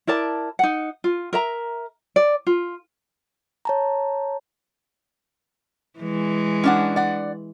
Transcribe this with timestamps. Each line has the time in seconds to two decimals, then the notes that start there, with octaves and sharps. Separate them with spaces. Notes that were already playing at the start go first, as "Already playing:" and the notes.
0.07 E4 A#4 D5 A5
0.59 D#4 F#5
1.04 F4
1.33 A#4 E5 A#5
2.16 D5
2.47 F4
3.65 C#5 A5 A#5
5.99 E3 G#3
6.64 C#4 D4 F#5
6.96 D5 F#5